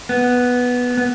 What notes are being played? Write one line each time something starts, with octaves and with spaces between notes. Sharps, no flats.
B3
B3